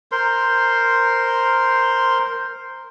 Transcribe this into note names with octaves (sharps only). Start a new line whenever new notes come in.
A#4 C5 C6